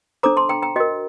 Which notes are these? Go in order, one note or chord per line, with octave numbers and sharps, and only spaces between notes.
D4 A4 C5 A#5 D6
A5 C6
G5 A#5
G5 A#5
F#4 A#4 D#5 G5